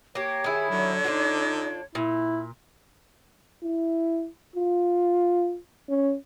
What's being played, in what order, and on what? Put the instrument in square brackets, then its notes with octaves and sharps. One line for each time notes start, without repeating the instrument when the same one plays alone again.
[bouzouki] A#3 G4 [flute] C#5
[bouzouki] D#3 E4 [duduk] G#4
[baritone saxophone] D3 [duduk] F#3
[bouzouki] D4 F4 F#4 [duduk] D#4
[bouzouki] A#2 [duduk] E4
[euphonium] E4
F4
C#4